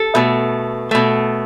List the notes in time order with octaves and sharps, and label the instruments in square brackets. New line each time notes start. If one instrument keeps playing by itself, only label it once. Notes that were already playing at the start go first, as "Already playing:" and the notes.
Already playing: [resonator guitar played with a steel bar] A4
B2 A3
B2 A3